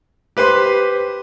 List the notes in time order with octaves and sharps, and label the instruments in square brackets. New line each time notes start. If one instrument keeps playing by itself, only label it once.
[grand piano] G4 B4 C5 C6